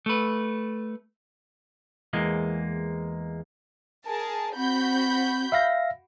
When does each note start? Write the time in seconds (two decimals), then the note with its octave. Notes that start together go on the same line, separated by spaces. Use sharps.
0.06 A3 B4
2.13 E2 E3 G#3 A#3
4.06 G#4 A#4 A5
4.56 C4 F#4 B5 G6
5.52 E5 F5 A#6